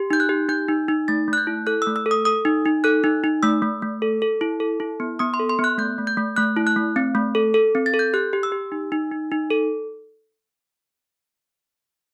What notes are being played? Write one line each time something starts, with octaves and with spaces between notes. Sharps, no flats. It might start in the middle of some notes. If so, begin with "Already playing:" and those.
Already playing: G4
D#4 G6
F#6
G4
D#4 G6
D#4
D#4
A3 A6
A3 F#6
G6
E4
A4 F#6
E6
A3
E6
A4
D#6
A4 D#6
D#4
D#4
A4 F#6
D#4
D#4
A3 E6
A3
A3
A4
A4
E4
A4
E4
B3
B3 D#6
C6
A4
C6
B3
F#6
A3 G6
A3
G6
A3
A3 F#6
E4
F#6
A3
C4
A3
A4
A4
C4
A6
A4
G6
G4 F#6
G4
E6
G4
D#4
D#4
D#4
D#4
A4